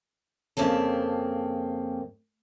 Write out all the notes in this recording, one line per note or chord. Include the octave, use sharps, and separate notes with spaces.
F2 C#3 A#3 C4 A5